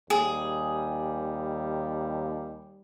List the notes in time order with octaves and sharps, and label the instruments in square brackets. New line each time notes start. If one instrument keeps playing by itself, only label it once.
[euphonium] D#2 [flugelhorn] G3 [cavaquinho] G#4